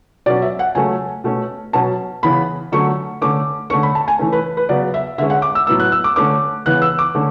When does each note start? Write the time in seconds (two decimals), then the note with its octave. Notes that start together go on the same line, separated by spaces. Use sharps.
0.26 B2 F#3 C#4 D5
0.42 E5
0.59 F#5
0.75 C#3 F#3 A3 C#4 G#5
1.24 B2 A3 C#4
1.73 B2 F#3 C#4 A5
2.23 C#3 E3 B3 B5
2.72 D3 F#3 A3 C#4 C#6
3.22 D3 A3 C#4 D6
3.70 D3 A3 C#4 C#6
3.83 B5
3.95 A5
4.08 G#5
4.19 E3 A3 C#4
4.32 B4
4.57 B4
4.69 C#3 F#3 B3 D5
4.94 E5
5.18 D3 G#3 C#4 E5
5.30 F#5
5.42 D6
5.55 E6
5.67 A2 F#3 B3 E6
5.80 F#6
5.92 E6
6.04 D6
6.16 D3 A3 C#4 D6
6.66 C#3 E3 B3 F#6
6.82 E6
6.99 D6
7.15 D3 A3 C#4